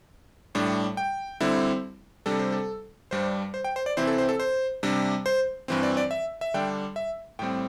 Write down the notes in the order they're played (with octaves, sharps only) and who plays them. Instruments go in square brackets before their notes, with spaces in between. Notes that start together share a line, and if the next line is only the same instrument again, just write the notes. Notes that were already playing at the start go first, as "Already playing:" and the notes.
[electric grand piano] A2 G3 D4
G5
D3 G3 C4 E4
C3 G3 D4 A4
C5
A4
G2 G3 D4 C5
C5
G5
C5
D5
C3 E3 C4 E4 C5
A4
C5
A4
C5
C3 G3 D4
C5
G2 E3 C4
D5
D5
E5
E5
D3 G3 D4 G5
E5
A2 G3 C4 G5